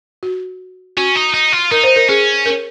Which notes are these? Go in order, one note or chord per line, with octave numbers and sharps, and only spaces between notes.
F#4
C#4 F#4
D#4
D#4
F4
D#4 A#4
C5
A#4
C#4 G#4
A#4